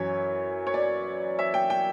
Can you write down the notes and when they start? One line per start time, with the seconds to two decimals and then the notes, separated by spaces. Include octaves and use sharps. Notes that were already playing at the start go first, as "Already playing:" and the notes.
Already playing: F#2 E3 C#5
0.67 C#5
0.74 D5
1.39 E5
1.54 G5
1.70 G5